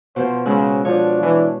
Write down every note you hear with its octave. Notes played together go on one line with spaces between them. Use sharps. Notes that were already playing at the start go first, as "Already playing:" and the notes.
B2 F3 C5
C#3 G#3 E6 F#6
F3 D4 C#5
E3